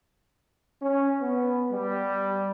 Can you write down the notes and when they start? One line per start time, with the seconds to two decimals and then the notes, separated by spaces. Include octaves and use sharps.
0.81 C#4
1.21 B3
1.72 G3